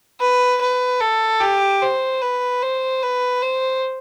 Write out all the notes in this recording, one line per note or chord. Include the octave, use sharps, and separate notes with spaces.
B4
B4
A4
G4
C5
B4
C5
B4
C5